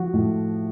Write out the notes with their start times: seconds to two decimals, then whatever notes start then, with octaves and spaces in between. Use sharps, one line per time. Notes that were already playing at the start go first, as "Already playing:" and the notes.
Already playing: F3 F#4
0.13 A2